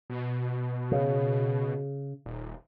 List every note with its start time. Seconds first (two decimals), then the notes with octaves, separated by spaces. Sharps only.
0.10 B2
0.92 C#3
2.26 D#1